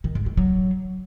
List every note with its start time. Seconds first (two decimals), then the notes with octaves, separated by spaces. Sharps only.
0.04 D#3
0.15 G#2
0.26 A3
0.37 F#3